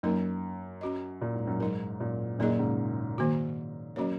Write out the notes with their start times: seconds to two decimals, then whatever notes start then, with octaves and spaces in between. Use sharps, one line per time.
0.03 F#2 F#3 A#3 D#4 A#4
0.81 C#4 F#4 D#5
1.21 A#2
1.34 G#2
1.47 F#2
1.60 G#2 F#3 D#4 A#4
2.00 F#2 A#2
2.39 F#2 A#2 A#3 D#4 G#4 D#5
2.49 D#3
2.59 G#2 C#3
3.18 D#3 A#3 F#4
3.96 F#3 A#3 C#4 F#4 C#5